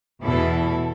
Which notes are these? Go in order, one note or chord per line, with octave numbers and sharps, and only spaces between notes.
E2 B2 E3 E4 A4